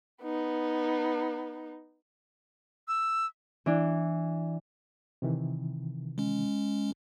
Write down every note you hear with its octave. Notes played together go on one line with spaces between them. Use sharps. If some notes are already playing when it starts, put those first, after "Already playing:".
B3 D#4
E6
E3 D4 E4
C3 D#3 E3
G#3 C#4